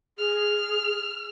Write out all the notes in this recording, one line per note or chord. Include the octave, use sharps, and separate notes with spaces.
G#4 F6